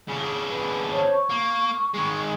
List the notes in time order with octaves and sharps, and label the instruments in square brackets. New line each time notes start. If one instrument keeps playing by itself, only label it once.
[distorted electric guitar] C#3 D4
[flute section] B4
C5 C#5 A5
C#6
[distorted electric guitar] A#3
D#3 G#3